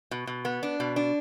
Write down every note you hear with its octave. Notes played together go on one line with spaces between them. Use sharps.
B2
B2
B3
D4
B2
D4